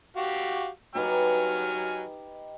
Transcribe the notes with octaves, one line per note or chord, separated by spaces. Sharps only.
F#4 G4 F5
F#3 D#4 G4 B4 G#5 F6